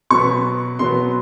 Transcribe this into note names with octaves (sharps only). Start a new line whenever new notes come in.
B2 F#3 B3 C#6
B2 F#3 B3 C6